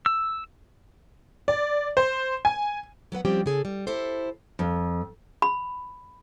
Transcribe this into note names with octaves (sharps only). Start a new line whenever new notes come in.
E6
D5
C5
G#5
F#3 B3 B4 F#5
F3 G3 C4 C#4 G4
C#3 G#4 A4
G3
E4 G4 A4 C5
F2
B5